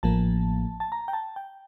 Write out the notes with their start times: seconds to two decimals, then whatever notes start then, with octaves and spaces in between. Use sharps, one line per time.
0.03 A1 A2 F3 A#3 A5
0.80 A5
0.92 A#5
1.08 G5
1.13 A5
1.36 G5